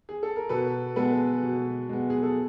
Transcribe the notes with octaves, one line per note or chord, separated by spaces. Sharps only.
G#4
A4
A#4
B2 A4 B4
G#3 B3 A4 B4
B2
G#3 B3
G#4
A4